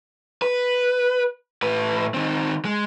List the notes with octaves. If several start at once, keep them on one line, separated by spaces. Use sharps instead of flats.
B4
A2 B4
D#3 C4
G#3